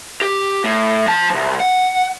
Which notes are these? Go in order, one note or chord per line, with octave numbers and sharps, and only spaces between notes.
G4
A2
F3 A5
C2 F3
F#5